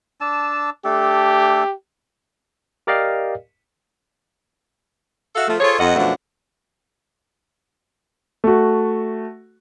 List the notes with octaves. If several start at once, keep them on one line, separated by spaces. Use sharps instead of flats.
D4 A5 E6
A3 D4 G4 A4
G4 A#4 D5 D#5 F5 G5
F#4 A4 E5 F5
F3 A3
F4 G#4 A4 C5 C#5
F2 D#5 F#5
F#2 B2 F3 A3 D4 F#5
A3 F#4